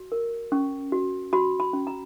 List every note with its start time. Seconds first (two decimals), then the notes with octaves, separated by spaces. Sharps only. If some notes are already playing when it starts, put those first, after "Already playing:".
Already playing: F#4
0.12 A#4
0.52 C#4 C#6
0.92 F#4
1.33 F#4 B5
1.60 B5
1.73 C#4
1.87 A#5